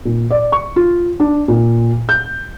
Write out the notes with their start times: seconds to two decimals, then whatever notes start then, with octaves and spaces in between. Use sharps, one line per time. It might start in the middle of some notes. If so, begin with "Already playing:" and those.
0.05 A#2
0.30 D5
0.52 C#6
0.76 F4
1.20 D4
1.48 A#2
2.09 G6